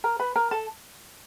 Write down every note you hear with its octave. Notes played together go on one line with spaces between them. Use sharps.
A#4 A#5
B4 B5
A#4 A#5
A4 A5